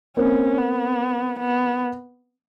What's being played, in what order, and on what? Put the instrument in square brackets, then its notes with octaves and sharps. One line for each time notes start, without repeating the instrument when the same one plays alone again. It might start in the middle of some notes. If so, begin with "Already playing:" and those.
[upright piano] A#3 C4 [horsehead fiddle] C#4
[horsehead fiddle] B3
B3